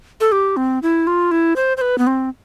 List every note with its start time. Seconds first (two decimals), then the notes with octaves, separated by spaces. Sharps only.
0.21 A4
0.32 G4
0.57 C4
0.83 E4
1.07 F4
1.31 E4
1.56 C5
1.77 C5
1.81 B4
1.98 B3
2.07 C4